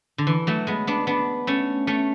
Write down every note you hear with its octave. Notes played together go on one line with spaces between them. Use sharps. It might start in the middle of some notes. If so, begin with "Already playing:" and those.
D3
E3
F#3 A3
G#3 B3
B3 D4
B3 D4
A3 C#4
A3 C#4